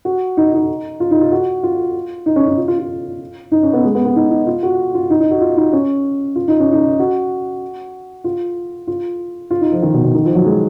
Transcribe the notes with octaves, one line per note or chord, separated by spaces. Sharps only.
F#4
D#4
D#4
F4
D#4
F4
F#4
F4
D#4
C#4
C#4
F4
F4
F4
D#4
C#4
B3
G#3
B3
B3
D#4
D#4
F4
F#4
F4
D#4
D#4
F#4
F4
D#4
C#4
F4
D#4
C#4
D#4
F#4
F4
F4
F4
D#4
F3
D#3
B2
B2
D#3
F3
F#3
G#3